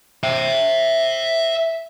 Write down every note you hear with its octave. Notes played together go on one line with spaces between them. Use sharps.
E5 G5